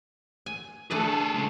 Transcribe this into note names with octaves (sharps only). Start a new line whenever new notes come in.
G#5
A3 D4 G#4 A4 B4
C#3 G#3